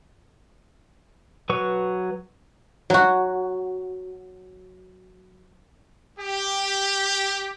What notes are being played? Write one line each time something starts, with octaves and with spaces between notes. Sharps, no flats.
F#3 B4 C#6
F#3 F#4
G4